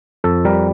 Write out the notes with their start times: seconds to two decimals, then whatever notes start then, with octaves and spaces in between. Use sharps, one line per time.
0.24 F2 A4
0.45 G3 A#4